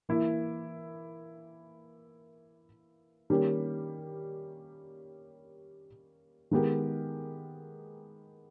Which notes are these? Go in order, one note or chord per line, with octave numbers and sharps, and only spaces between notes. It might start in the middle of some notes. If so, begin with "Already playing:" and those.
E3 A#3 E4
D#3 G3 A#3 C#4 G4
D#3 G#3 B3 G4 A#4